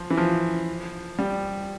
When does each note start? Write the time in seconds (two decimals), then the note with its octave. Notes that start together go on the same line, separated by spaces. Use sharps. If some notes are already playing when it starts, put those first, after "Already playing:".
Already playing: F3
0.10 E3
0.17 F3
1.18 G3